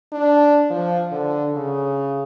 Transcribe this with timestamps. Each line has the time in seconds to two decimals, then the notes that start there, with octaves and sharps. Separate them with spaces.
0.12 D4
0.70 F3
1.11 D3
1.56 C#3